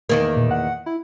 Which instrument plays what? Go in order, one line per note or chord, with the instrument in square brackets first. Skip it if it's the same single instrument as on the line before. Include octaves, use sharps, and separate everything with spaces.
[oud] E2 D#3 A#3
[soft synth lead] A#2
F#5
E4